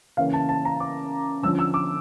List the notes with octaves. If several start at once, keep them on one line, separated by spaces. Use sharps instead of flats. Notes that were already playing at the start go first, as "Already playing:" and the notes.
C#3 E3 A#3 C#4 F5
A5
A5
A#5
D6
D3 F3 C#4 E6
E6
D6